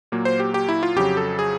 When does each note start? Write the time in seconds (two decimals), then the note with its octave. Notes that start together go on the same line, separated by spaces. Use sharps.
0.12 A#2 F#3 A#3
0.25 C5
0.40 G4
0.54 G4
0.69 E4
0.83 F4
0.96 F2 C#3 F#3 G4
1.17 A4
1.39 G#4